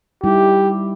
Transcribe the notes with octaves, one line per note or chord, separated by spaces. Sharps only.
G3 D#4 E4 G4